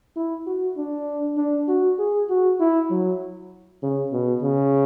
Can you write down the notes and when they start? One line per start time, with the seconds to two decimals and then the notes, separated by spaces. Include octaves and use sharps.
0.16 E4
0.47 F#4
0.77 D4
1.37 D4
1.68 F#4
1.99 G#4
2.30 F#4
2.60 E4
2.90 F#3
3.83 C#3
4.12 B2
4.43 C#3